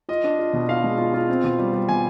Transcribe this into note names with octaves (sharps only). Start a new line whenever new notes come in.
F4 D#5
D4
F4
B2
F4 F5
G#3
F4
F4
C4
B2
G3
G3
B2 G#5